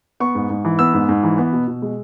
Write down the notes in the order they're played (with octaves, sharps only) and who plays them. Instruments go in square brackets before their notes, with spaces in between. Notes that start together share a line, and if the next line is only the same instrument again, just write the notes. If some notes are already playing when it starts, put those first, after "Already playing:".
[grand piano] B3 C#6
G#2
G#2
E3
B3 E6
G#2
G#2
E3
B3
B2
B2
G#3